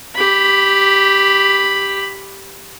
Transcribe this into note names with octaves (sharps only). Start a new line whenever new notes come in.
G4 B5